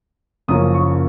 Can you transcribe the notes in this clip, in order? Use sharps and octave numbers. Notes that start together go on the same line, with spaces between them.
F#1 F#2 F3 A#3 C#4 D#6
C#6